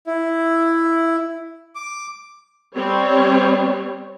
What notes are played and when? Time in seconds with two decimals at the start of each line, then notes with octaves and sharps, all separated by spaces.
0.07 E4
1.75 D6
2.76 G3 C4 C#5